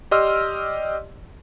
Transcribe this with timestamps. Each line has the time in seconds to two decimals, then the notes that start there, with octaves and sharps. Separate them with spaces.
0.11 G4 D5 D#5 C6 E6 F6